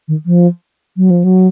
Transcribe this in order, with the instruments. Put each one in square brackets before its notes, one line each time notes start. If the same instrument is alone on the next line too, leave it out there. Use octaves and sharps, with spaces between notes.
[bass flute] D#3
F3
F#3
F3
F#3